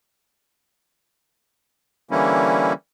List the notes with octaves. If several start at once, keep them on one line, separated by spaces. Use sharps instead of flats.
D3 E3 G3 A#3 C#4 E4